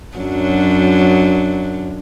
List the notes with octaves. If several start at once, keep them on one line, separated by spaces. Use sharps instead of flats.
F#2 F#3 D4